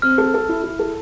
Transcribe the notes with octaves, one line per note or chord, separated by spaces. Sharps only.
C4 F6
A4
A4
E4
E4
A4